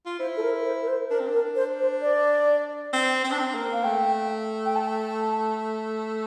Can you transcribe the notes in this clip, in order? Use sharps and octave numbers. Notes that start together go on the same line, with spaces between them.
F4
E4 C5
A4
A#4
C5
A#4
C5
D4 A#4
C4
D4
A#4
C5
C5
D5
C4
C4
D4
C4
A#3
F5
A3 G5
G5
A5